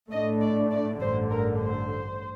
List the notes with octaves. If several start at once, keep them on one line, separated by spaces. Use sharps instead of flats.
A2 A3 D4 D#5
D5
D5
A1 G2 D3 C5
A#4
C5